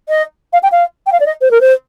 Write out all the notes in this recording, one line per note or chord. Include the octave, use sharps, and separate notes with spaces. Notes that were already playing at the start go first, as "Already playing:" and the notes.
D#5
F5
G5
F5
G5
F5
D5
D#5
C5
A#4
C5